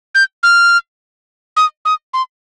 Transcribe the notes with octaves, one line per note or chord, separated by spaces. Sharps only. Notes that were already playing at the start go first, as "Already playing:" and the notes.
G6
F6
D#6
D#6
C6